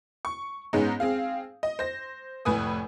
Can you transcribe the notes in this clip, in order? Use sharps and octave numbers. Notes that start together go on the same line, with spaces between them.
C#6
G#2 G#3 B3 C#4 D#4
C4 G#4 F5
D#5
C5 A#6
F1 A2 B4 G#5 D#6